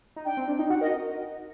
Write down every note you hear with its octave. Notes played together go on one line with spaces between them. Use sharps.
D#4
D4 G5
C4
D4
D#4
F#4 F#5
A#4 D#5